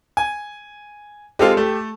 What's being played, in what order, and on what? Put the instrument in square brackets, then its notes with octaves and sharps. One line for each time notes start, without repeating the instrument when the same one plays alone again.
[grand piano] G#5
[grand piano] G#3 C4 F4 [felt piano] G4 A4
[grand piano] A3